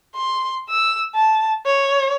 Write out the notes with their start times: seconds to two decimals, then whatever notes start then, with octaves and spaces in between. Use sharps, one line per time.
0.15 C6
0.69 E6
1.15 A5
1.66 C#5